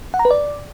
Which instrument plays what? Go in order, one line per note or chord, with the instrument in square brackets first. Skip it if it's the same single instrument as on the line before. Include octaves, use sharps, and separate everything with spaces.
[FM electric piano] F#5
A#5
B4
D5